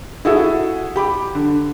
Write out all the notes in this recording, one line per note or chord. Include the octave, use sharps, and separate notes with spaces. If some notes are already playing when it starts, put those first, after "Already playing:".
E4 F#4 G#4 A4 E5 F#5
G4 B5 D6
D3